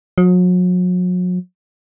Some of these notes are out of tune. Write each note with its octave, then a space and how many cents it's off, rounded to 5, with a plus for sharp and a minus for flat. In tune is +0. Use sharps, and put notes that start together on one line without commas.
F#3 -40